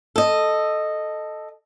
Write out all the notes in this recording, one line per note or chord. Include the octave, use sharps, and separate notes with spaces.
A4 D#5